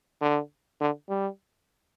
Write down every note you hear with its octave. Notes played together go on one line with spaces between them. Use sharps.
D3
D3
G3